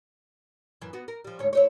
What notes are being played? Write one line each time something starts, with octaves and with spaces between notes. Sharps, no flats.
F#2 E3
B3 F#4
A#4
F3 G3
D2 G#2 C#5
E4 C5 C#5